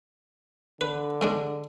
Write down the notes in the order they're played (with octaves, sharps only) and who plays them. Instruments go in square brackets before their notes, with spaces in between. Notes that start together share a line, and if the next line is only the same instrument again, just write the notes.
[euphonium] D3 [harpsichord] B4
[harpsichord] G#2 G#3 D4